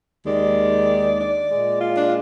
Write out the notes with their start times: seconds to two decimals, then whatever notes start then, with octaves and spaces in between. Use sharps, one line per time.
0.25 D#2 D#3 G#3 D5
1.19 D5
1.50 A#2 G#3
1.81 F4
1.97 D4
2.05 F4